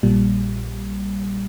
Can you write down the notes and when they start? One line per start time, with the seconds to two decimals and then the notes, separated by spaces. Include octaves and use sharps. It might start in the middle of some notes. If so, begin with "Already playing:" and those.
0.03 A#1 A#2 G3